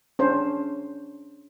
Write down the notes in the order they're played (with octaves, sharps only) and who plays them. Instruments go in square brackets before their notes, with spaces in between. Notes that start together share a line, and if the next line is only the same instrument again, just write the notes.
[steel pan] C#4 D4 C5